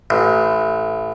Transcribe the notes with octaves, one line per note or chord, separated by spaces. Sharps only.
A1